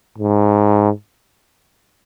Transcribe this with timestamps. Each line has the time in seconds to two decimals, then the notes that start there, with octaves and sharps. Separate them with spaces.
0.18 G#2